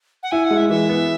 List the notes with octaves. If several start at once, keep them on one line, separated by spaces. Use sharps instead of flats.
F#5
E4 G#5
F#5
G#3
E5
E3 E5
B3